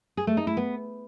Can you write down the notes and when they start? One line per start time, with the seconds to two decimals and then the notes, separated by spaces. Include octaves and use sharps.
0.17 G#4
0.27 A3
0.37 D#4
0.47 E4
0.57 B3